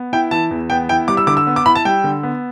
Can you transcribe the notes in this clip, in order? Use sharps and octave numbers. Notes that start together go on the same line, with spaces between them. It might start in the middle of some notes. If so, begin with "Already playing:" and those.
Already playing: B3
E4 G5
E3 A5
E2
B3 G5
E4 G5
G3 D6
E6
D3 D6
E6
B3
D6
E4 B5
A5
G3 G5
D3
B3